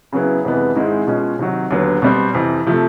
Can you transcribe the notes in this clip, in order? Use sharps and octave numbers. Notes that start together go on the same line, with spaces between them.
C#3 F#3 B3 E4
F2 C3 E3 G#3 B3
G#2 D#3 G#3 C4 E4
B2 G#3 C#4 F4
C3 D#3 F#3
D#2 D3 F#3 B3
B2 G3 C4
F2 C3 E3
C3 F3 A3